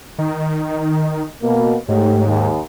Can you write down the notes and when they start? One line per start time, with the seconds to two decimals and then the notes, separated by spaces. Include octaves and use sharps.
0.19 D#3
1.42 B2 A#3
1.89 G#2 A3 G4 C#5
2.26 D#2